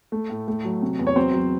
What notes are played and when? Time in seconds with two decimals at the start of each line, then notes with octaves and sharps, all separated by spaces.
0.12 A3
0.30 A2
0.48 A3
0.65 F#3
0.82 C3
0.99 E2
1.07 C#5
1.16 F#3 C4 C5
1.34 F#3